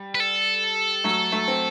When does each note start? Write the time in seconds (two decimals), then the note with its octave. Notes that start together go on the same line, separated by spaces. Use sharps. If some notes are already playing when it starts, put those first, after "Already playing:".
Already playing: G3
0.15 B4
0.20 A4
1.04 F#3 A3
1.32 F#3 A3
1.48 C4